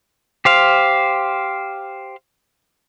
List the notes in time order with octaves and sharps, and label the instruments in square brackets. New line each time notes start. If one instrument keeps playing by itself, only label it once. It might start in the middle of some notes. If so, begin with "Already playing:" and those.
[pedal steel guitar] G4 C5 F5